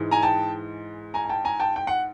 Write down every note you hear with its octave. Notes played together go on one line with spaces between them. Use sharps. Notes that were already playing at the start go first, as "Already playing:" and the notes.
Already playing: G#2 E3 G#3
G#5 A#5
G5 A5
G#5 A#5
G#5
G5 A5
G#5 A#5
G5 A5
G5
F#5